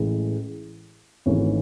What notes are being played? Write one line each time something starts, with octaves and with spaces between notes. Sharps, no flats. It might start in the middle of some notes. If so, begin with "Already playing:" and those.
Already playing: A1 A2 E3 G#3
G#1 G#2 E3 A3 C#4